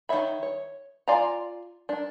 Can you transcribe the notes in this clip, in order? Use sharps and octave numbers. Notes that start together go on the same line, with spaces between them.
D#3 C4 C#5 E5 B5
C#5
F4 D5 F5 G#5 A#5
D4 A#4